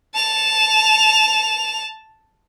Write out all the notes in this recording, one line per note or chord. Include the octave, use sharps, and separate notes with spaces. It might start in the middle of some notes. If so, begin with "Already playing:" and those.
A5 F7